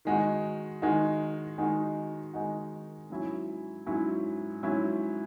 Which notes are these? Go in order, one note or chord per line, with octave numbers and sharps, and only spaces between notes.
D#3 G#3 D#4 F#4
D#3 G#3 D#4 F#4
D#3 G#3 D#4 F#4
D#3 G#3 D#4 F#4
G#2 F#3 C#4 E4
G#2 F#3 C#4 E4
G#2 F#3 C#4 E4